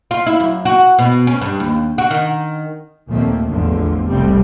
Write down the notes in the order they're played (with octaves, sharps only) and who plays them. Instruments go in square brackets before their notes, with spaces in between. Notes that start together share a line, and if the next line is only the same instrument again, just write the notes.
[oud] F4
E4
F#2
F#4
B2
C#4
G2
D#2
F#4
D#3
[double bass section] D#2 A#2 F3 A3 A#3 C4
A1 E2 D3 F3
F1 C2 F3 G3 A3 C4